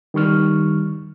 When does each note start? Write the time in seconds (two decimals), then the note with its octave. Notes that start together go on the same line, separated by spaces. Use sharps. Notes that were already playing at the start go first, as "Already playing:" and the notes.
0.14 D#3 G3 C#6 F6